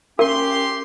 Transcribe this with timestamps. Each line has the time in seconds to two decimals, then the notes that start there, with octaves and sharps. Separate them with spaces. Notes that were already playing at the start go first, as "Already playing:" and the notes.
0.19 C#4 G4 A#4 C6